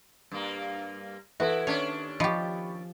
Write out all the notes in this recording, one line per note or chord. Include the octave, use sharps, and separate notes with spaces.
G2 A#3
E3 E4 F#4 A4 B4 E5
D#2 C#4 D4 C#5
F3 G4 D#5 B5 C#6